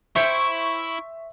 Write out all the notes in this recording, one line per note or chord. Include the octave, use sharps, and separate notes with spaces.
E4 C5 C#5 E5 G5 C#6